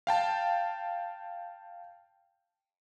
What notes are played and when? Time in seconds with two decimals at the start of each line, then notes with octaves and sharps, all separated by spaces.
0.07 F5 G5 A5